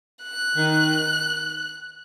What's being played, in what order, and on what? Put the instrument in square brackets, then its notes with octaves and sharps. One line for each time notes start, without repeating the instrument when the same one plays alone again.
[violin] F#6
[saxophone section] D#3